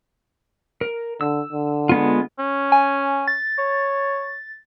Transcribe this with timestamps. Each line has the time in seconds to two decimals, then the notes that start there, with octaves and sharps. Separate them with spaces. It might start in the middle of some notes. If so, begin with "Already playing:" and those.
0.81 A#4
1.21 D3 E6
1.52 D3
1.89 G#3 B3 F4
2.39 C#4
2.72 G#5
3.28 A6
3.59 C#5